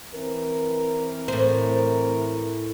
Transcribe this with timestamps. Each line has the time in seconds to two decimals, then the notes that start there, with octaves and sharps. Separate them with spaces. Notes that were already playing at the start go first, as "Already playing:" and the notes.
0.14 E3 C4 A#4
1.28 A2 C5